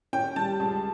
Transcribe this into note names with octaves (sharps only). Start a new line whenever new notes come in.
C#4 G5
G3 A5
C#2